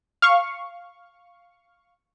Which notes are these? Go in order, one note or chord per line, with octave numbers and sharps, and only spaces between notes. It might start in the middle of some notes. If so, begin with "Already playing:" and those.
F5 C#6